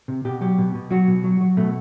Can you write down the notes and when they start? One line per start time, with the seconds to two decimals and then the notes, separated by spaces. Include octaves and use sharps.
0.08 C3
0.25 B2 G4
0.41 F#3 G4
0.58 B2
0.75 B2
0.91 F#3 F#4
1.08 B2
1.24 F#3
1.41 F#3
1.57 B2 A3